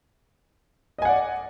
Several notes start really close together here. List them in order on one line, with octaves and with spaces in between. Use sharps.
D#5 G#5 F#5 D5